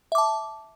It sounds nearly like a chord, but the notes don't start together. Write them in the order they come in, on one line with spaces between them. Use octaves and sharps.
E5 D6 A5